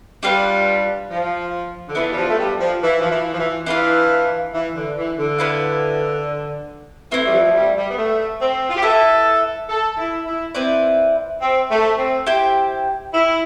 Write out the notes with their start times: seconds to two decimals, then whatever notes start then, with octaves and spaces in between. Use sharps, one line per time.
0.23 G3 D4 F4 B4 F5
1.10 F3
1.88 D3
1.95 E3 B3 D4 F4 B4
2.11 G3
2.17 F3
2.29 A3
2.38 G3
2.59 F3
2.81 E3
3.00 F3
3.09 E3
3.32 F3
3.39 E3
3.66 E3 D4 F4 B4 F5
4.53 E3
4.75 D3
4.96 E3
5.18 D3
5.39 B3 E4 B4 F5
7.11 E3 A3 C4 E4
7.25 G3
7.32 F3
7.44 F3
7.54 G3
7.76 G3
7.89 B3
7.97 A3
8.40 C4
8.69 F4
8.76 G4
8.82 E4 A4 B4 E5
9.69 A4
9.97 E4
10.26 E4
10.54 C4 E4 B4 D5
11.40 C4
11.70 A3
11.98 C4
12.26 E4 G4 C5 G5
13.13 E4